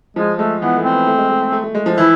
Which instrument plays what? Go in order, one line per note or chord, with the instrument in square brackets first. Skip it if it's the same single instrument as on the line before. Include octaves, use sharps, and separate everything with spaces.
[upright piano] F3 [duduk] G#3
[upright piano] G#3 [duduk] A3
[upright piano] E3 [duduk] B3
[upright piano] A3
[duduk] C4
[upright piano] B3
A3
G#3
G#3
A3
A3
A3
G#3
F3
[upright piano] E3 [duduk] E4